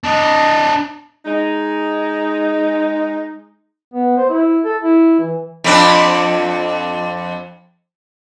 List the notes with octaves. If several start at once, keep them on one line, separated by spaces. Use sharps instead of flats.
D4 D#5
G#3 D#4
B3
C5
E4
A4
E4
E3
F2 C4 D4